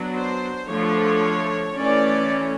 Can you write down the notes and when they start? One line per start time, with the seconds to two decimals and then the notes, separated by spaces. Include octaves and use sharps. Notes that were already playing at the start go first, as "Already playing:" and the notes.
Already playing: F#3 B3 D4
0.15 C5
0.69 D3 F3 A3 D4 C#5
1.77 E3 A3 C#4 D5